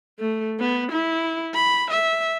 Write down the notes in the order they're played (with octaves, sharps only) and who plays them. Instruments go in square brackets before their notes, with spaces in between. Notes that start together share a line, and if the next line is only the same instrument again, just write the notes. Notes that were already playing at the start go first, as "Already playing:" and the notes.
[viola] A3
B3
E4
B5
E5